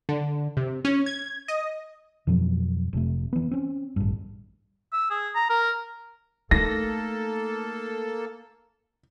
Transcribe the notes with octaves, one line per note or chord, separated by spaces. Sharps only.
D3
C3
C#4
G#6
D#5
F2 B2 F3 F#3
F1 C3 A3
E3 B3
C4 C#4
A1 G2
E6
G#4
A#5
A#4
A3 A#3 D#4 A4 A#6